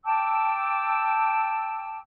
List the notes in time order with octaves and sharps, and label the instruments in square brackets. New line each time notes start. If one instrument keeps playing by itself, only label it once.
[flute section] G5 A5 D6 E6